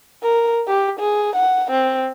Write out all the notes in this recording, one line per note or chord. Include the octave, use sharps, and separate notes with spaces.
A#4
G4
G#4
F#5
C4